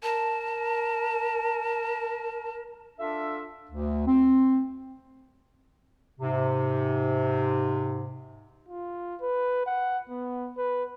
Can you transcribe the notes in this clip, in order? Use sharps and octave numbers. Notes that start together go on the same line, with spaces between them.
A#4 A5
D4 F4 A4 E5
D2
C4
G#2 C3
F4
B4
F#5
B3
B4